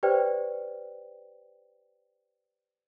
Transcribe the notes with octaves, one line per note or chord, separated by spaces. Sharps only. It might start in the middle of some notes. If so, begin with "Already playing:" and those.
G4 B4 C5 D5 G5